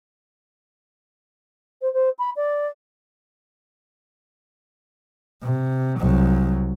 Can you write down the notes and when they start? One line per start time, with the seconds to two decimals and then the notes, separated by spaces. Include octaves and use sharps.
1.82 C5
1.93 C5
2.19 B5
2.36 D5
5.43 C3
6.00 C2 F#3